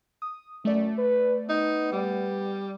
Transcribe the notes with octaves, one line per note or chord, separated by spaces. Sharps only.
D#6
F#2 A3 D5
B4
B3 D#4
G3